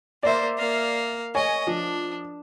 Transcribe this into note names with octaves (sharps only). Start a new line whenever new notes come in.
A#3 C5 D5 E5
A#3 F5
C#5 D#5 G#5
F3 D4